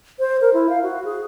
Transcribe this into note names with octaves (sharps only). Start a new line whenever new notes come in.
C5
A#4
E4
F5
F#4
G#4